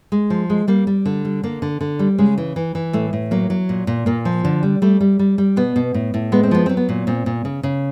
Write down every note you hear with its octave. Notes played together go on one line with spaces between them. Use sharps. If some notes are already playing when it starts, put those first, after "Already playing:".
G#3
F3
G#3
G3 A#3
G3
D3
G3
D3 A#3
D3
D3
G3
C#3 G#3
E3
E3
E3
A2 A3
A2
F#3 A#3
F#3
A#2
A#2
A#2 A#3
F3
D3
G3
G3 A3
G3
G3
G3
B2 B3
B2
A2
A2
G#3 B3
C4
F3 B3
F#3 C4
B3
A#2
A#2 C4
A#2
C#3
C#3